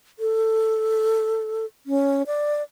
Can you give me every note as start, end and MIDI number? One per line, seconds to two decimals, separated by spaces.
0.19 1.65 69
1.86 2.23 61
2.27 2.63 74